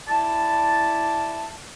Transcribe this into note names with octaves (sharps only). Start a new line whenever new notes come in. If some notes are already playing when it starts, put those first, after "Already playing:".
E4 D5 A5